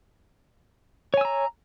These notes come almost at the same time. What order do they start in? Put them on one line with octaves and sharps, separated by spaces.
C#5 G#5 E6 A#5